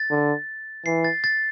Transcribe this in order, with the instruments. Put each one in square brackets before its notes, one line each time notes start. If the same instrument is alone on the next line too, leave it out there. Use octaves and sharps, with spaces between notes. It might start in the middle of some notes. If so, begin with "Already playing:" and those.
Already playing: [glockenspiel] A6
[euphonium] D3
[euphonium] E3 [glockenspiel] C7
[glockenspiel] A6
A6